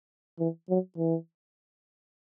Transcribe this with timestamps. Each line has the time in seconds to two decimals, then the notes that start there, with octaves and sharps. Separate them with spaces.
0.39 E3
0.69 F#3
0.97 E3